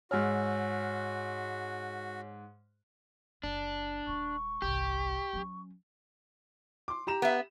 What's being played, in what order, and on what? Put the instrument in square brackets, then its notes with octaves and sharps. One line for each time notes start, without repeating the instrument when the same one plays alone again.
[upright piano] G#2 F6 [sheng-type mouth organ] F#4 [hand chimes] C#5 G#5 E6
[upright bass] F#1 [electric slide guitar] D4
[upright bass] D#1 G#3 [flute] C#6
[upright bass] G1 C2 [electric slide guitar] G4
[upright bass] F#3 C#4
[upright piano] C6 D6
G4 A#5 E7
[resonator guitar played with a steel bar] B3 E5